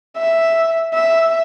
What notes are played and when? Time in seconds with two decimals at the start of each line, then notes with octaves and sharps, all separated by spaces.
0.17 E5
0.94 E5